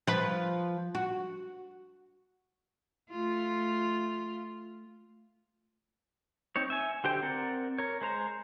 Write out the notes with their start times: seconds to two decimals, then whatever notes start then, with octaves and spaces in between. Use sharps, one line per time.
0.07 F3 B4
0.95 F#4
3.11 A3 F4
6.56 C4 D#4 C#5
6.70 E5 G#5
7.04 D3 G4 C5 G5
7.23 C4 A#4 D5 F#5
7.78 A#4 C#5
8.01 G#3 C5 A#5